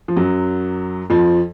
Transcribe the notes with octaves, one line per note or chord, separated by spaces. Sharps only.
F3
F#2 F#3
F2 F3